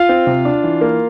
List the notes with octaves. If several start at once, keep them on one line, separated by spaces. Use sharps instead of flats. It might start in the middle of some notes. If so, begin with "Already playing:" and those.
Already playing: F4 F5
C4
C3
D4
E3
A#3